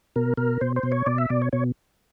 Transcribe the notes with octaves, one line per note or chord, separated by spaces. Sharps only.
B2 A#4
B2 A#4
B2 C5
C5
B2
C#5
B2 D5
E5
B2 D5
C#5
B2 C#5